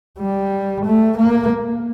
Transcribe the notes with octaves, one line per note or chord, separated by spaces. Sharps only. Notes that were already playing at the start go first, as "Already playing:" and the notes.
G3
A3
A#3